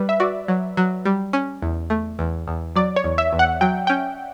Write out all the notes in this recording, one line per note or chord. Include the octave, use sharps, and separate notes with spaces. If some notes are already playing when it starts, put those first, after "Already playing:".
Already playing: G3 B4
E5
F#4 D5
F#3
F#3
G3
C#4
E2
A3
E2
E2
F#3 D5
C#5
E2
E5
E2
F#5
F#3 G5
C#4 G5